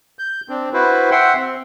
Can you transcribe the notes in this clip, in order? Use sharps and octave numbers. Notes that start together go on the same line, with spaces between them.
G6
C4 D4
E4 F#4 B4 C5
E5 F#5 G5 C6
C4